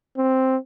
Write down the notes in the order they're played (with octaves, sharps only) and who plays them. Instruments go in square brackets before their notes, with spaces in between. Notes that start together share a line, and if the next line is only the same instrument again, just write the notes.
[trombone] C4